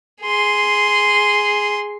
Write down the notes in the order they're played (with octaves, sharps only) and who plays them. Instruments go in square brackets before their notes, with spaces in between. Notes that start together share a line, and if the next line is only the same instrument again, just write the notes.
[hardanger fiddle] G#4 C6